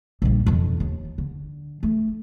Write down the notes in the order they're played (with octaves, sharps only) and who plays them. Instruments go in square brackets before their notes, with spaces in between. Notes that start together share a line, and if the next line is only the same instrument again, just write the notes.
[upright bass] A#1 G3
E1 F2
D#2
D3
A3